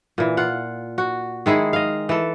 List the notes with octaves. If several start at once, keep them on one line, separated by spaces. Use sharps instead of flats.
A#2 E3
F4 F#5
F#4
D#3 G#3 E4 G#4
D#5 F5
E3 A4